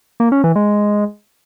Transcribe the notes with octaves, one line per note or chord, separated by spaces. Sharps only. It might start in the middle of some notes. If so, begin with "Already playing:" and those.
A#3
C#4
E3
G#3